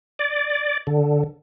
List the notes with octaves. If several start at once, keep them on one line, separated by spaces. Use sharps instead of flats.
D5
D3